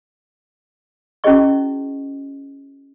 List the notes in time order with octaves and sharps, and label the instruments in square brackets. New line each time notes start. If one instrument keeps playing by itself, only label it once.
[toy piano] C#4 E4 F#4 G#4 D#5 C#6